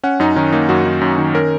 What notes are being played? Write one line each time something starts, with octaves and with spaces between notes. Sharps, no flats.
C#4 F#5
F#2 D#4
D#3 C#4
A#3 D#4
F#2 F#4
D#3
F#2
D#3
C#4 A#4